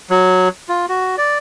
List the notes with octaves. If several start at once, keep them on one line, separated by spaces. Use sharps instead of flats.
F#3
F4
F#4
D5